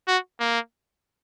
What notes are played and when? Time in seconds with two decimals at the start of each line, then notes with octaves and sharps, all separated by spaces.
0.08 F#4
0.40 A#3